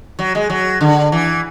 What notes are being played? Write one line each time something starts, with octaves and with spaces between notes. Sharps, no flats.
F#3
G#3
F#3
D3
E3